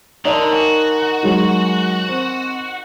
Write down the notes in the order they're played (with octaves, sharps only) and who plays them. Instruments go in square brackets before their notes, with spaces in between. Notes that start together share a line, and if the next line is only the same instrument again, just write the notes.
[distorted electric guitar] D3 [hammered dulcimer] D#4 A#4 C6 [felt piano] C#5 D5 A5
[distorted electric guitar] F#4 [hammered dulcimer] G#5
[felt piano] F#3 G#3 D#4
C4